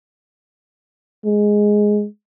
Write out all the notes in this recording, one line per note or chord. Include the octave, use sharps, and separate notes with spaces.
G#3